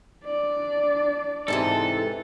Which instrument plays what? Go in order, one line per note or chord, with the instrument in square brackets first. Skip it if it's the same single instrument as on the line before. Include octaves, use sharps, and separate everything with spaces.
[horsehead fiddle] D4 D5
[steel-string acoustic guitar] G#2 C3 E3 [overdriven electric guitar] A4